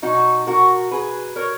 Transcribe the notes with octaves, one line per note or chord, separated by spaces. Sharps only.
B2 F#3 D#4 F#4
F#4 A#4
G#4 B4
A#4 C#5